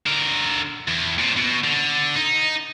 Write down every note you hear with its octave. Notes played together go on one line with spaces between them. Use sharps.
D3 A#4
E2
A#2 C4
B2
D3
D#4